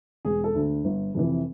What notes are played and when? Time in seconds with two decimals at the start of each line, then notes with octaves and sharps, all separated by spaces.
0.25 E1 G#4
0.44 A4
0.54 D2 D3
0.84 G1
1.15 F2 C3 E3